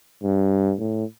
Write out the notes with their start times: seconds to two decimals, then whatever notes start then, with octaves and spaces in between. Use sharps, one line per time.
0.23 G2
0.79 A2